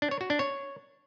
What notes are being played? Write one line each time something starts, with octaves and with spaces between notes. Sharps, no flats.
D4
C#5
F#4
D4
C#5